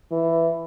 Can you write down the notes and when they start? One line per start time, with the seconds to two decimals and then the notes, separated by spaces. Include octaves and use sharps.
0.11 E3